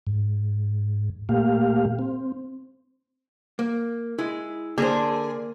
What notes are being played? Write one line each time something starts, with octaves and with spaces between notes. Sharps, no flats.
G#2
A#2 A3 A#3 G4 F5
C4
A#3
G#3 E4
D3 A#3 G#4 A#4 C5